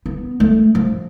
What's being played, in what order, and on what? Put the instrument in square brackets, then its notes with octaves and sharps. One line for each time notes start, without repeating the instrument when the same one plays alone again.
[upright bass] B3
A3
F3